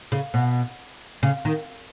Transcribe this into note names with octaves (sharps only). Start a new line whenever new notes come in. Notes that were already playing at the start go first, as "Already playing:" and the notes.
C#3
B2
C#3
D#3